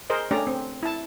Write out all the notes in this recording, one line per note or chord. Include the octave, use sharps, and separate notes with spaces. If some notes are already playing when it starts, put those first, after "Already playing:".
G#4 A#4 C5 D#5
A3 C#4 D4 G4 D5 A#5
C4
E4 A5